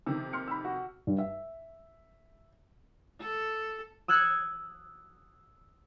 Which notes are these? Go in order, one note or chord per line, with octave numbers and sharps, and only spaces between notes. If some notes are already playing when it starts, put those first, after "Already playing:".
F2 C3 D#3 E6
C6 F6 C#7
B5 E6
F#4
G2
E5
A4
D#6 E6 F#6 G#6 C#7